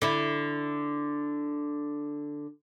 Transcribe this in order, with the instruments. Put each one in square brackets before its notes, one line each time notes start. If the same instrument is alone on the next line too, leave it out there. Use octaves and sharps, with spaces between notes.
[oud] D3 E4